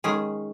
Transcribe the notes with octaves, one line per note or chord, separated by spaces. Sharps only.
D#3 G#3 C#4 G#4